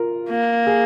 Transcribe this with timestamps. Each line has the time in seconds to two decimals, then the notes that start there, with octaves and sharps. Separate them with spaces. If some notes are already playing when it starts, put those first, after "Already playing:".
Already playing: F4 A#4
0.30 A#3
0.67 G#4